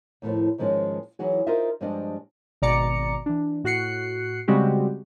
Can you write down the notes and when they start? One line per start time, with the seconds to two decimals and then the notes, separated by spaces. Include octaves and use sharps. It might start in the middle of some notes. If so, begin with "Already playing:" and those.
0.22 D#2 A2 E3 F3
0.58 G#2 D#3 F3 G#3 C#4 D#4
1.19 E3 F#3 D#4 F#4 G#4
1.47 D#4 F4 A#4 C5 D#5 E5
1.81 G2 F3 G3 G#3 D4 D#5
2.62 G#1 B2 D5 A#5 D6 C#7
3.26 E3 D4
3.64 A2 F#4 F#6 C7 C#7
4.48 C#3 G3 G#3 C4 F#4 G4